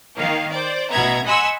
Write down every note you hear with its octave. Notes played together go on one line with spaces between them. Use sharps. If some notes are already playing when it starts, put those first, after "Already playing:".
D#3 A#3 F5
C5 D5
A1 B2 B3 E5 A#5 G#6
D#5 F#5 G#5 B5 C6 E6